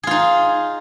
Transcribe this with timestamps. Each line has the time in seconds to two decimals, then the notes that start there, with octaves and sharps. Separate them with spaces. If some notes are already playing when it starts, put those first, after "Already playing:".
0.03 G#4
0.07 F4
0.11 D#4